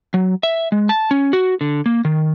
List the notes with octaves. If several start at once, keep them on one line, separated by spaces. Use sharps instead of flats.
F#3
E5
G#3
A5
C#4
F#4
D3
A#3
D#3